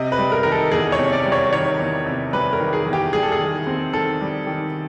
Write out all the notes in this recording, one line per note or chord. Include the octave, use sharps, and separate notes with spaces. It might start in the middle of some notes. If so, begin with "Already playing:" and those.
Already playing: C3 D#5
B4
G3
A#4
D#3 A#4
A4
E2 G#4
C#5
C3
D5
G3
C#5
D#3 C#5
E2
C3
G3 B4
A#4
D#3
G#4
E2
G4
G3 G#4
A4
G#4
D#3
C4
D#3 A4
G3
D#3